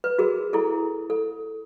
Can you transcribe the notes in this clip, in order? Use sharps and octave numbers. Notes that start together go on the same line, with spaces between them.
B4
F#4 G#4 A#4
E4 G#4 A4
A4